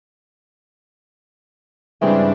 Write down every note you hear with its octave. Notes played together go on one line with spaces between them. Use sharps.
G2 C#3 E3 G3 G#3 C4 D4